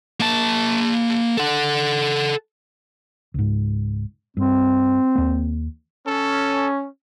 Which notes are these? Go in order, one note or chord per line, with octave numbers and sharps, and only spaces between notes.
A#3 A5
A4 F#5
C#2 G#2
G2 C4
D#2 A#3
C#4 A4